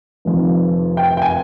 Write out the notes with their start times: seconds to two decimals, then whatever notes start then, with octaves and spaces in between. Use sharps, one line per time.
0.25 F1 F2 D#3
0.97 G5
1.17 G5
1.22 G#5